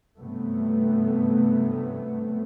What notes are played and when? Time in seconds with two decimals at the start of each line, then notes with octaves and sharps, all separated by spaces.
0.19 G2 C3 F#3 A3 B3